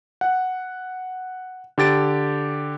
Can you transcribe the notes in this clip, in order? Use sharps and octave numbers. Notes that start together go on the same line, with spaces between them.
F#5
D3 G4 A6 D7